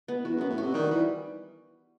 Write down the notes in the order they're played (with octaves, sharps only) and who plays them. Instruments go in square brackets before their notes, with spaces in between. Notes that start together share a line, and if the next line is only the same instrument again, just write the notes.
[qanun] B3
[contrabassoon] E2 [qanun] F#4
[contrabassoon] F#2
[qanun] B3
[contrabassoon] A2
[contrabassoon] C3 [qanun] F#4
[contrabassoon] D#3 [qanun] G3
[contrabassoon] E3 [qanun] G3